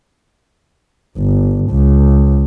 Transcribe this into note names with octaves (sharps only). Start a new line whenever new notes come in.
G1
C#2